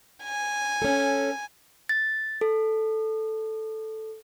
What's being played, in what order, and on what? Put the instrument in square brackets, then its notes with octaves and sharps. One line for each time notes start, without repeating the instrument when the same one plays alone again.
[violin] G#5
[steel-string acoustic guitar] C#4 A4
[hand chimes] A6
A4